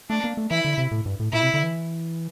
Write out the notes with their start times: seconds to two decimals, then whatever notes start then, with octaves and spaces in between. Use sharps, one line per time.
0.10 A3 D4
0.24 A#3
0.37 A3
0.51 E3 E4
0.65 D3
0.78 C3
0.91 A2
1.06 G2
1.20 A2
1.32 A#2 E4
1.42 C3
1.54 D3
1.63 E3